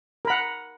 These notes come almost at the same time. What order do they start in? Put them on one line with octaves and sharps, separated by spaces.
A#4 B5 F#5